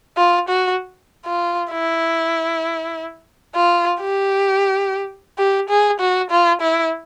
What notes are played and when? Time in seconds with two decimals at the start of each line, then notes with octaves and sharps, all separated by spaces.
0.17 F4
0.49 F#4
1.26 F4
1.72 E4
3.55 F4
4.00 G4
5.38 G4
5.69 G#4
6.00 F#4
6.30 F4
6.61 E4